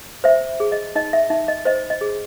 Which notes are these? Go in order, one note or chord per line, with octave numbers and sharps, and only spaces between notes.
C5 E5
G#4
D#5
D#4 D#5
E5
D#4 E5
D#5
C5 D#5
D#5
G#4